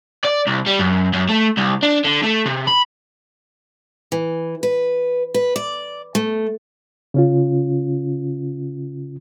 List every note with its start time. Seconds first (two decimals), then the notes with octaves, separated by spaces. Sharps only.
0.25 D5
0.47 C2
0.66 G3
0.79 F#2
1.13 F#2
1.29 A3
1.57 C2
1.83 D4
2.05 D3
2.23 A3
2.46 C3
2.68 B5
4.12 E3
4.63 B4
5.34 B4
5.56 D5
6.15 A3
7.14 C#3 C#4 F4